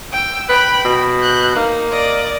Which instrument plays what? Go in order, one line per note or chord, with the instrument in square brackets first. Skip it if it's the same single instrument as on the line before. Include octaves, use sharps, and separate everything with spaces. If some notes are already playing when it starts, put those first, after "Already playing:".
[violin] G5 E6
[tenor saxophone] B4 [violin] G5 B5
[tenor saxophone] B2
[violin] F#6 G6
[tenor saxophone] A#3 [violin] D#4
[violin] D5 D#5